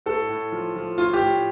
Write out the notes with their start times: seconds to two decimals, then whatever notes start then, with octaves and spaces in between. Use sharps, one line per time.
0.06 A2 A4
0.29 A2
0.52 F3
0.75 F3
0.98 A2 F4
1.13 G4
1.21 A2